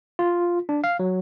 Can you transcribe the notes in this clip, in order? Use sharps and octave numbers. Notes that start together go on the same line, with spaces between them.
F4
D4
F5
F#3